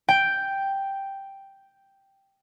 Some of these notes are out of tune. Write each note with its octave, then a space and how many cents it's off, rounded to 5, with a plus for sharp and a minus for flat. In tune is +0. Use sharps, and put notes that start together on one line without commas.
G5 +0